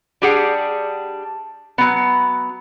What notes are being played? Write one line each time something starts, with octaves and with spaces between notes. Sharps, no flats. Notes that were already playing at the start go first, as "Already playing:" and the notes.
G3 D4 G4 G#4 F#5
F#3 B3